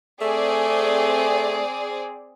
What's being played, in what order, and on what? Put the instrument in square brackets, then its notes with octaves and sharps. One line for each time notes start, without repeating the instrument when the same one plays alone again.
[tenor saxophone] A3 [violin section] C4 G#4 D5